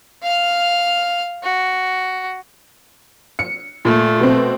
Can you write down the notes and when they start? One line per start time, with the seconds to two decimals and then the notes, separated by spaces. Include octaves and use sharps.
0.23 F5 F6
1.43 F#4
3.39 C#7
3.85 A#2 A3
4.20 B2 C4